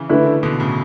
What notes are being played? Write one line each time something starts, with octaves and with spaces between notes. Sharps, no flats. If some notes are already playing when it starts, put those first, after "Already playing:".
Already playing: C#3 E3
D3 A3 E4 B4
B2 D3
A2 C#3